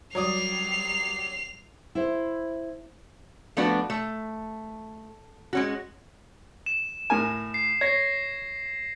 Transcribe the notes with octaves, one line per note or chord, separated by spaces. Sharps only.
F#3 G3 D5 D#6 C7 F7
E4 C5
F3 A3 B3 D4 F#4
A3
G#3 C#4 F#4
E7
A2 A#4 G#5
C7
C#5 G#6 A#6 C7